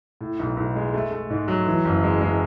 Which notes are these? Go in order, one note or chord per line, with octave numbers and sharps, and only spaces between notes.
A2
B1
B1
G#3
A3
A3
G#2
F#3
E3
F#1
G#3
G#3